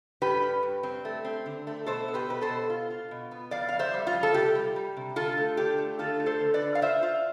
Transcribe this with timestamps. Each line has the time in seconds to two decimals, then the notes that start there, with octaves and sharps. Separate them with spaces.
0.22 G2 G4 B4
0.42 G2
0.63 G2
0.83 C4
1.05 A3
1.25 C4
1.46 D3
1.67 A3
1.86 B2 A4 C5
2.08 B3
2.14 G4 B4
2.29 B2 B4
2.41 A4 C5
2.49 B2
2.70 F4
2.90 F4
3.11 B2
3.31 B3
3.51 F2 D5 F5
3.69 F2 F5
3.79 C5 E5
3.94 G3
4.07 F4
4.13 F2
4.23 A4
4.34 C3 G4
4.55 G3
4.76 G3
4.97 C3
5.16 D3 F4 A4
5.38 A3
5.57 D3 G4
5.78 A3
5.99 D3 F4 A4
6.20 A3
6.26 A4 C5
6.40 D3
6.54 B4 D5
6.62 D3
6.75 F5
6.82 F4 C5 E5
7.03 F4